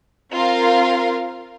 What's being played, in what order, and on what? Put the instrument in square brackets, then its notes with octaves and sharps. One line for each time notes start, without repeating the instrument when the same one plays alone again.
[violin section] C4 F4 A#4 F5